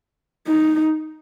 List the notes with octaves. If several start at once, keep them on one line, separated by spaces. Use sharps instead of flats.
D#4